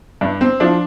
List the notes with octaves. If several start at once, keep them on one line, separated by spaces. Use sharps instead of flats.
G2 D4
C4
F3 D4